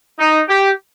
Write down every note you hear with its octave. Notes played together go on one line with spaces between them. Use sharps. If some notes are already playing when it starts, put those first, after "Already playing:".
D#4
G4